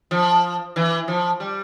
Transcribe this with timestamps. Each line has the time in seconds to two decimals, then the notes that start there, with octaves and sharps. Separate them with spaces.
0.11 F3
0.76 E3
1.08 F3
1.40 G3